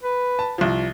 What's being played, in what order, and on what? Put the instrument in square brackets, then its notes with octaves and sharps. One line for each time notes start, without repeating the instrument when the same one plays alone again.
[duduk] B4
[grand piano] A5
C2 F3